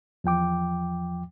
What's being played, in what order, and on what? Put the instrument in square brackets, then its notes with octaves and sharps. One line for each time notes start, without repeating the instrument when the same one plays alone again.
[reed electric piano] E2 F3 G5 D6